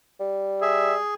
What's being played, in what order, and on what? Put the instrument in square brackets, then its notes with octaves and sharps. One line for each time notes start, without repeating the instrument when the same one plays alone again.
[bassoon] G3
[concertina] G#4 [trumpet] E5